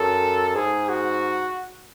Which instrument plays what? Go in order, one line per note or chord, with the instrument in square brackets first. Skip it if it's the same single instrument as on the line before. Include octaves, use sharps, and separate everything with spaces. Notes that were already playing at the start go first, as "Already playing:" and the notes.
Already playing: [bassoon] F#2 [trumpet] A4
[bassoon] G#2 [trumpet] G#4
[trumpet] F#4